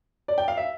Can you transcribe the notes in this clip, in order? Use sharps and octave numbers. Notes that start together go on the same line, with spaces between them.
D5
G5
F5
E5